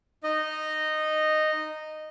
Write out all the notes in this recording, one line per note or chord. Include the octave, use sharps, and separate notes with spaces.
D#4 D#5